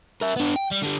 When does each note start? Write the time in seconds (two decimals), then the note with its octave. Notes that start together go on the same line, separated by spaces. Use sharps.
0.21 A#4 E5
0.36 B3 D4
0.56 G5
0.71 G3
0.83 D3 G3